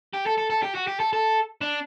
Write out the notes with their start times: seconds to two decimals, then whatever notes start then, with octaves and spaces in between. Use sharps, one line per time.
0.13 G4
0.26 A4
0.38 A4
0.50 A4
0.63 G4
0.75 F#4
0.87 G4
1.00 A4
1.13 A4
1.61 D4